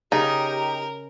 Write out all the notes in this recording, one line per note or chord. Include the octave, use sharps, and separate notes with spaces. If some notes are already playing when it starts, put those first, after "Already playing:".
C#3 D#4 G4 A#4